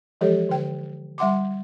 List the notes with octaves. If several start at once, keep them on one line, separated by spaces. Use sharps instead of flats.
E3 F3 G#3 G4 A4 C#5
D3 G5
G3 E5 F#5 C6 D6